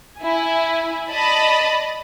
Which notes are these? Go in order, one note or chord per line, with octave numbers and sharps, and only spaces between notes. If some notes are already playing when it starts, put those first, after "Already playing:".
E4 G#5
D5 D#5 A5 B5